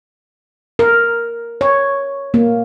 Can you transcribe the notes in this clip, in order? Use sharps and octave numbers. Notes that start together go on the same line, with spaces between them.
A#4
C#5
A#3